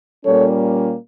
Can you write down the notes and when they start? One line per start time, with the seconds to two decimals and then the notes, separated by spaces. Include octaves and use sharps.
0.25 A#2 G3 A#3 C#4 A4 C#5